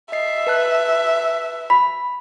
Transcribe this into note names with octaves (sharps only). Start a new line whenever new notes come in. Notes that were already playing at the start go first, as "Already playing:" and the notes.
D#5 E5 C7
B4 A5 F#6
B5 B6